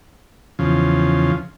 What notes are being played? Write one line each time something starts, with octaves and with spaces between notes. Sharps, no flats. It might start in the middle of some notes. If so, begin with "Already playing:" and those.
E2 C#3 F3